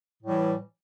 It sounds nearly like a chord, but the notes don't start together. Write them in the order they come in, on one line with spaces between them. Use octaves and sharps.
A2 G3 E3